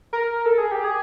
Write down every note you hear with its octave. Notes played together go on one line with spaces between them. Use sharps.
A#4
A4
G#4
G4
G#4